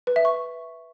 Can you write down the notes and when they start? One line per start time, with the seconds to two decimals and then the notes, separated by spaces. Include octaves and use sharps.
0.07 B4
0.16 E5
0.25 C#6